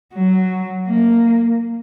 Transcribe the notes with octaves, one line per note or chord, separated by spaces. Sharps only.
F#3
A#3